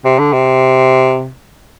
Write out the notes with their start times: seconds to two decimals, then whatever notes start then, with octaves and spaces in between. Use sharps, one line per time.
0.05 C3
0.19 D3
0.33 C3